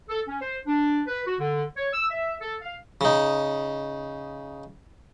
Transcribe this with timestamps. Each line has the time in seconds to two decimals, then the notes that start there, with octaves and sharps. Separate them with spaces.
0.09 A4
0.28 C#4
0.41 C5
0.67 D4
1.07 B4
1.27 F#4
1.40 D3
1.77 C#5
1.93 E6
2.10 E5
2.41 A4
2.62 F5
3.01 C#3 D#4